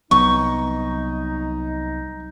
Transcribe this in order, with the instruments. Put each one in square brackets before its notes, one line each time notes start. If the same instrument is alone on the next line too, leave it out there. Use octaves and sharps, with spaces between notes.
[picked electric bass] C2 F#3 B3 [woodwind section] D#4 [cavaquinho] C#6